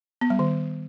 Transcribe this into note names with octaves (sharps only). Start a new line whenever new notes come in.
B3
G3
D#3